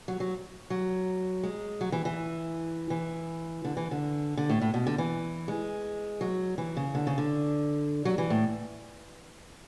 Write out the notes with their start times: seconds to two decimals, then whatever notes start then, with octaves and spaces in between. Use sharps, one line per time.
0.08 F#3
0.20 F#3
0.70 F#3
1.43 G#3
1.81 F#3
1.92 E3
2.05 E3
2.90 E3
3.65 D3
3.77 E3
3.91 D3
4.37 D3
4.49 A2
4.61 A2
4.74 B2
4.87 D3
4.98 E3
5.48 G#3
6.21 F#3
6.58 E3
6.77 C#3
6.95 D3
7.07 C#3
7.18 D3
8.05 F#3
8.18 E3
8.30 A2